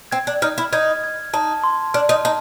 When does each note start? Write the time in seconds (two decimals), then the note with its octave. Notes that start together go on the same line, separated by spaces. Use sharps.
0.12 C4 G#6
0.27 D4
0.42 D#4 F6
0.58 E4
0.73 D#4 G#6
1.04 G#6
1.34 D#4 A5
1.64 C6
1.94 D4 F6
2.09 D#4
2.25 D#4 A5